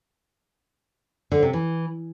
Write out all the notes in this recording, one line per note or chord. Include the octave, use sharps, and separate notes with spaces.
D3
C3
E3